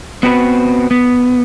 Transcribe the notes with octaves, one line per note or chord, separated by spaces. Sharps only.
B3 C4 F#4 B4
B3